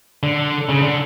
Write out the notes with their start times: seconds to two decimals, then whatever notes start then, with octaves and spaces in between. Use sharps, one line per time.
0.23 D3
0.69 C#3
0.82 D3